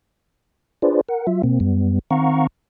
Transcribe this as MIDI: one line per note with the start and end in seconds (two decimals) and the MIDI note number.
0.82 1.01 62
0.82 1.01 65
0.82 1.01 68
0.82 1.01 71
0.82 1.01 72
0.82 1.01 74
1.09 1.27 70
1.09 1.27 78
1.27 1.42 54
1.27 1.42 65
1.27 1.42 76
1.43 1.59 47
1.43 1.59 58
1.43 1.59 60
1.60 1.99 42
1.60 1.99 55
1.60 1.99 59
2.11 2.47 51
2.11 2.47 60
2.11 2.47 77
2.11 2.47 78
2.11 2.47 82
2.11 2.47 85